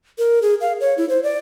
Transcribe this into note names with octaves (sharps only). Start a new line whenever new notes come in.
A#4
G#4
F5
C#5
E4
C5
D5